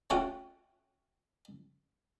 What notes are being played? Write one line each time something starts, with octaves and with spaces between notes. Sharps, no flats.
A3 C#4 F4 F#4 F5 G5